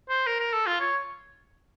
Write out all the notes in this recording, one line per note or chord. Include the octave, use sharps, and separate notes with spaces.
C5
A#4
A#4
A4
F4
C#5